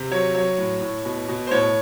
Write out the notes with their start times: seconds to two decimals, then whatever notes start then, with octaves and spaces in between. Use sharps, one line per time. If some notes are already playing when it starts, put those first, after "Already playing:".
Already playing: C3
0.11 F#3 C#5
0.34 F#3 C#5
0.58 A2
0.81 A2
1.05 B2
1.28 B2
1.47 C5
1.51 A2 C#5